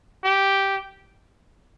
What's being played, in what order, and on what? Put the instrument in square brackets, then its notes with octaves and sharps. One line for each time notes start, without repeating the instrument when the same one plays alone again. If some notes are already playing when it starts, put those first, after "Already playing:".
[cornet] G4